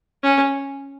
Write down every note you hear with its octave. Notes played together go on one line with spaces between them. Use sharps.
C#4